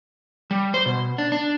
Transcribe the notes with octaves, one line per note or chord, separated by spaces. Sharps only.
G3
C5
B2
D4
D4